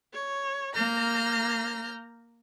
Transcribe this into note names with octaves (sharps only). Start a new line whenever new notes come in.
C#5
A#3 A#5 F6 G6